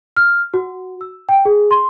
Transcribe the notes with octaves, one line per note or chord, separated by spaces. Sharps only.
F6
F#4
E6
G5
G#4
C6